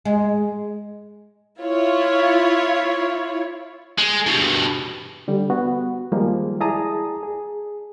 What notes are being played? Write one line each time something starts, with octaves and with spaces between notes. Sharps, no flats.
G#3
E4 F4 C#5
G#3
G2 B2
D3 G3
B3 F#4
D#3 F3 G3 G#3 A#3
E4 G#4 D5 A5 A#5 D#6
G#4